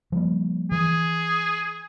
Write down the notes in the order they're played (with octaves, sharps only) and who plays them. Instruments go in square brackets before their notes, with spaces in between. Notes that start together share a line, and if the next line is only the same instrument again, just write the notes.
[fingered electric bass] F3 G3 A#3
[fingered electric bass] E3 [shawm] G#4